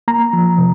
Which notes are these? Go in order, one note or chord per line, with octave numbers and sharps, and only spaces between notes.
A#3 A#5
F3
C3